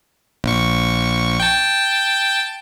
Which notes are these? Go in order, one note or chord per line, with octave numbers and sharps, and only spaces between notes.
A#1 C#6
G5 A5